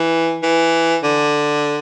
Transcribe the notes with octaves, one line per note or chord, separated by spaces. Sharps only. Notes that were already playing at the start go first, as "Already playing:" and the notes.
Already playing: E3
E3
D3